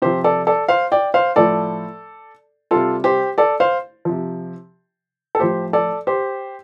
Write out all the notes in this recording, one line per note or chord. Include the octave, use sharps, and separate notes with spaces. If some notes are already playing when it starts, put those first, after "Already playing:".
C3 F3 G4 C5
A4 D5
A4 D5
C5 F5
D5 G5
C5 F5
A2 F3 A4 D5
C3 G3 F4 A4
G4 C5
A4 D5
C5 F5
C3 F3
A4
A2 F3 G4 C5
A4 D5
G4 C5